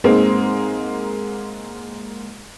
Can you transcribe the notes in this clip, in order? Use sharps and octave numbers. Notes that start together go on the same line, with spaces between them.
G#2 G#3 A#3 C4